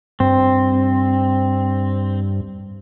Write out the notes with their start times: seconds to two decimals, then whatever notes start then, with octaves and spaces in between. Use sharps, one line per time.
0.20 G2 C4